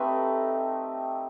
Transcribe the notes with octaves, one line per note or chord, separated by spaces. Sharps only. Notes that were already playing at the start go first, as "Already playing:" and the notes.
Already playing: A3 C4 D#4 G4 B4